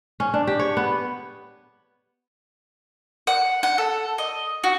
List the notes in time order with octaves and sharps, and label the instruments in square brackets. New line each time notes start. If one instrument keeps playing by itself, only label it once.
[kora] C#4
D4
G4
C#5
B3
[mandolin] F#5
F#5
A4
D#5
F#4